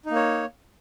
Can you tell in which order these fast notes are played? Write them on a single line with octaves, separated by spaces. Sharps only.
D#4 A#3 C#5